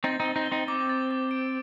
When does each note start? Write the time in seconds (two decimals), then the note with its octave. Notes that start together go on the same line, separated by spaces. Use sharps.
0.04 C4 D#4 A6
0.20 C4 D#4
0.25 G7
0.36 C4 D#4
0.46 G7
0.52 C4 D#4
0.68 C4 D6
0.89 A6
1.11 D6
1.31 D7